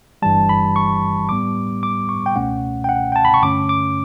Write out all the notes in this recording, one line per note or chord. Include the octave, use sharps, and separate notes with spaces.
G1 G2 E3 G3 A5
B5
C#6
A2 G3 B3 D6
D6
C#6
G5
C#2 B2 A3 C#4 F#5
G5
F#5
G5
A5
B5
C#6
G2 D3 A3 C#4 D6
D6